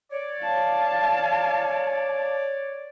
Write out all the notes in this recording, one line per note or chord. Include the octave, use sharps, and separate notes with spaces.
C#5 D5
F5 A5